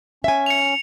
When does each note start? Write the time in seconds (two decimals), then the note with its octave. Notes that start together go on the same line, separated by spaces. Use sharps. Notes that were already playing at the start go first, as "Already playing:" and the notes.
0.24 C#4 E5 G#5
0.46 C#7 F7